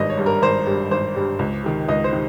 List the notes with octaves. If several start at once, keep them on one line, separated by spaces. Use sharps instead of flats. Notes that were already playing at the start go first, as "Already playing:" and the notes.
Already playing: G#1 G2 G3 D#5
C#5
G2 G3
A#4
G#1 C5
G2 G3
G#1 C5
G2 G3
C#2
C3 D#3
C#2 D#5
C5
C3 D#3